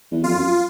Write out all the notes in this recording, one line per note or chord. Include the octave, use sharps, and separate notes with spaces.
E2
F2 F4
F#2